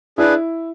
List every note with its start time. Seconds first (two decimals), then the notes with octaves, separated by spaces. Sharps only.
0.18 D4 E4 G#4 B4